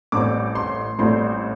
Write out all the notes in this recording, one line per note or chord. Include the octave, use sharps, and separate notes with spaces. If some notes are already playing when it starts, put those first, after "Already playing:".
A1 A2 G3 C4 D6
C6
A1 A2 G3 C4 C6